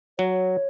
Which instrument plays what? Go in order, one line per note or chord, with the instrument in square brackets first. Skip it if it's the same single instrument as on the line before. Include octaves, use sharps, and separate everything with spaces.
[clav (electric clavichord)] F#3 [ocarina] C#5